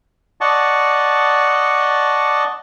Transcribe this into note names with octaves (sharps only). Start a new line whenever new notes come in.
D5 D#5 F#5 A5 C#6